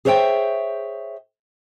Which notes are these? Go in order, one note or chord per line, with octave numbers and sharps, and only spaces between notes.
G#4 C5 C#5 E5 F#5 G5